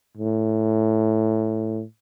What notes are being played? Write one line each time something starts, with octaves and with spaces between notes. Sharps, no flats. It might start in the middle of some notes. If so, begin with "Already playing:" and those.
A2